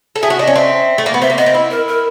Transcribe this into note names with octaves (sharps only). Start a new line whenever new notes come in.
A4
G#4 E5
F#4
D4 D#5
C#4
C4 E5
A3
A#3
B3
C4 E5
A#3
B3 D#5
C4
E4
A#4
A#4